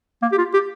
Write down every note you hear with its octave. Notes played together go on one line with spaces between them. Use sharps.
A#3
G4
F4
G4